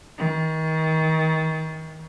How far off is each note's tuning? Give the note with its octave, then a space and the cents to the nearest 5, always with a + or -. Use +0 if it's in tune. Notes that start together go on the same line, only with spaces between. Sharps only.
D#3 +30